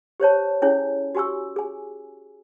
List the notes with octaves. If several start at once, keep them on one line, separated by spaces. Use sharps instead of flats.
G4 C5 C#5 A5
C#4 E4 G#4 C#5 G#5
F#4 G4 G#5 C#6 E6
G#4 G#5